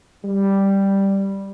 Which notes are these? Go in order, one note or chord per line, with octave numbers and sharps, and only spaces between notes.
G3